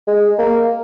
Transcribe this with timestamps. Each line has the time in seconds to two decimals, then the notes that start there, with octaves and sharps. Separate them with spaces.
0.07 G#3
0.38 A#3